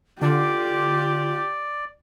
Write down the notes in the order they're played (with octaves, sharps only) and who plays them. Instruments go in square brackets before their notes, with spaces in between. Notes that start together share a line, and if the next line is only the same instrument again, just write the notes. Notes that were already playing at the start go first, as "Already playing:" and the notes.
[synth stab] D3 [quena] F4 [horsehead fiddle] G4 [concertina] D5